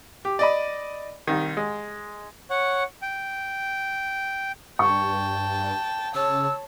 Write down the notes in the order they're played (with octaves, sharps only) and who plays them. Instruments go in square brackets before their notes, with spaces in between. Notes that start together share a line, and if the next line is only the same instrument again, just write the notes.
[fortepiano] G4
D5 D#5 B5
C2 D#3
G#3
[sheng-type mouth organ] C#5 F#5
G5
[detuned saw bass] G2 [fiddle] G5 A5 [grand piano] C#6
[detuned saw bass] C#3 [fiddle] C#5 A5 [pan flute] E6